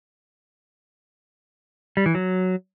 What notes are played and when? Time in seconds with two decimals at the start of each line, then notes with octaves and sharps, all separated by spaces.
1.97 G3
2.06 E3
2.15 F#3